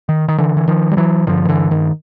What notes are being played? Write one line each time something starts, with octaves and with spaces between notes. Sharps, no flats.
D#3
D#3
D3 E3
E3
D#3 F3
G3
E3 F#3
G2 D3 D#3 F3
D#3
D3 E3
D#3